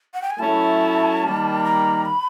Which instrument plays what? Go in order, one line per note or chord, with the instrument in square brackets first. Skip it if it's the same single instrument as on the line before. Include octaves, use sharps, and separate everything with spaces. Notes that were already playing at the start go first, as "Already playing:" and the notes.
[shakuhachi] F#5
G5
G#5
[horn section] F#3 A3 C#4 E4 [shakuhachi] A5
[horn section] D#3 G3 A#3
[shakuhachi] A#5
B5